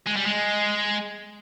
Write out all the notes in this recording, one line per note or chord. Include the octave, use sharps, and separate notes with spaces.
G#3
G3
G#3